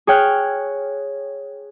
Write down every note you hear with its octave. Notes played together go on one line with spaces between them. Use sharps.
G#4 C#5 G5 F6 F#6